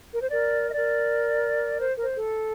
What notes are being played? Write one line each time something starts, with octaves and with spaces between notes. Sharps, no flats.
A#4
C5
A#4 D5
D#5
A#4 D5
C5
A#4
C5
A4